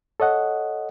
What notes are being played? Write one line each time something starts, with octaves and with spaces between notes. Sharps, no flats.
A4 C#5 D#5 F#5